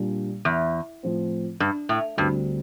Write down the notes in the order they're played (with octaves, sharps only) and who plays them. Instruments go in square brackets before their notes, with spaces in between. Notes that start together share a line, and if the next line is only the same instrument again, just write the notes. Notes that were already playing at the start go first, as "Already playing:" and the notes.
Already playing: [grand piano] A#2 G3 D4
[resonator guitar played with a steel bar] E2
[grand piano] A2 F3 C4
[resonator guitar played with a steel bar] G2
A2
[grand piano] D2 D3 G3 C4 [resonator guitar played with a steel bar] G2